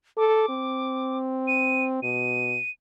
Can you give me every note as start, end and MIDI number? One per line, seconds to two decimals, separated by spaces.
0.17 0.47 69
0.17 1.18 86
0.49 2.01 60
1.48 1.84 99
2.03 2.57 47
2.03 2.70 99